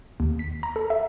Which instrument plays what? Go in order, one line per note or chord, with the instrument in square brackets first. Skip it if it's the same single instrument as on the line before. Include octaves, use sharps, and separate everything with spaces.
[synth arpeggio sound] D#2
B6
A#5
A4
E5